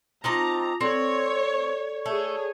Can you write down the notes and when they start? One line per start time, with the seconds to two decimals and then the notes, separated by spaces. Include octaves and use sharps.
0.24 C4 D#4 F4 A5 A#5 D6 D#6
0.81 C4 A4 C#5 D5
2.06 A3 G#4 C#5